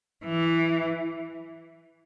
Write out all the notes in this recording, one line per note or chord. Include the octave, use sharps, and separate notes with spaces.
E3